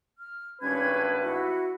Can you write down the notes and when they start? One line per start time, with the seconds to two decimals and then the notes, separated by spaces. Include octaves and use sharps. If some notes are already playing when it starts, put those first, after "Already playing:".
0.17 F6
0.61 G#1 G2 C#4 B4 G#6
1.20 E4 F#4